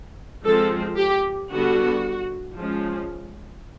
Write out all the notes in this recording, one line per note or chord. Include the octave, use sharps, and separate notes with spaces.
F3 G#3 C4 A4
G4
D3 G3 B3 F#4
F3 G#3 C#4